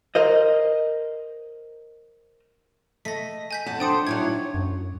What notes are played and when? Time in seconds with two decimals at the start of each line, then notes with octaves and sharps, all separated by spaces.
0.15 A#4 C5 D#5
3.05 A3 D#5 A#6 B6
3.51 G#5 G6 B6
3.66 F2 A2 F#5 A5
3.80 D4 C5 G5 D#6 C#7
4.07 A2 D#3 F#3 C#5 G#6
4.54 F#2